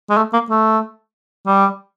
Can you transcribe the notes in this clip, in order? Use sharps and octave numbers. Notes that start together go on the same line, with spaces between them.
G#3
A3
A#3
A3
G3